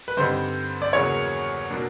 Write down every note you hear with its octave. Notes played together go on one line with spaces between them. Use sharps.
B4
G2 D3 G3 C4 D#4 C5
D5
E2 C#3 F#3 A#3 C#5
B2 F#3 A#3 D4